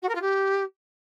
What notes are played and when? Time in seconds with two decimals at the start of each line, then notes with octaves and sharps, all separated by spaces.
0.02 F#4
0.09 A#4
0.15 F4
0.21 G4